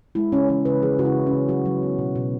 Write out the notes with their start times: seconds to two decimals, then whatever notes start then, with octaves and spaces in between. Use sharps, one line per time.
0.15 G#3 E4
0.32 C#3 C#4
0.49 E3 C#4
0.65 C#3 B4
0.82 E3 G#4
0.99 C#3 F#4
1.05 E4
1.15 C#3
1.27 C#4
1.33 C#3
1.49 F#3 F#4
1.66 F#3
1.83 B3
1.98 B2
2.16 B2